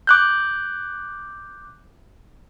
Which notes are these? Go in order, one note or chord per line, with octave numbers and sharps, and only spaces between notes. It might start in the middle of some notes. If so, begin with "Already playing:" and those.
D6 F#6 G6